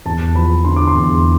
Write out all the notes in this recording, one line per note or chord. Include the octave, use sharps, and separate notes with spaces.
E2 A5
F3 B5
D3 C6
D6
C6
E2